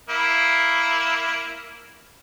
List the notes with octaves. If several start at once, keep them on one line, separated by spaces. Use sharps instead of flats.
A#3 E4